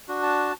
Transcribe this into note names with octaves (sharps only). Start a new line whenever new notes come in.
D4 F#4
A5